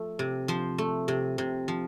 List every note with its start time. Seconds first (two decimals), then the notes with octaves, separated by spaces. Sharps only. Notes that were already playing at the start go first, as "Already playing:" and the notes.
Already playing: F3 A3
0.19 C3
0.48 F3 C5
0.78 A3
1.08 C3
1.38 C3
1.68 F3